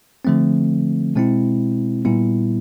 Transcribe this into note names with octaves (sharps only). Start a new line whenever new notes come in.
D3 F3 A3 C4
B2 G#3 C4 E4
A#2 G3 B3 E4